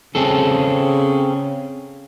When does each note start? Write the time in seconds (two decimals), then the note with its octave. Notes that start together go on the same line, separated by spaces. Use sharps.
0.15 C#3 C4 G#4 A4